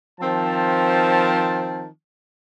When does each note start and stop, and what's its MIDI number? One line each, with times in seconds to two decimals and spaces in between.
0.20 1.86 51
0.20 1.86 53
0.20 1.86 60
0.20 1.86 81